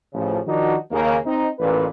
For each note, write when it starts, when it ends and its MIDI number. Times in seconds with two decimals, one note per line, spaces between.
0.14 0.38 33
0.14 0.38 49
0.14 0.38 53
0.45 0.75 51
0.45 0.75 53
0.45 0.75 62
0.45 0.75 63
0.45 0.75 66
0.91 1.16 39
0.91 1.16 49
0.91 1.16 58
1.24 1.47 60
1.24 1.47 63
1.59 1.85 33
1.59 1.85 46
1.59 1.85 71